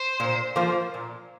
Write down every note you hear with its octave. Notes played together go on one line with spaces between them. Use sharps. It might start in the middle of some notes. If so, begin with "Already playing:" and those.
Already playing: C5
A#2
F3 A#3 F4 C5
A#2